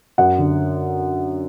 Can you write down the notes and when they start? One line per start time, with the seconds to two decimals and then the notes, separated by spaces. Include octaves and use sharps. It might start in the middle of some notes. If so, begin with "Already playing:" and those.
0.18 F#2 F#5
0.38 D3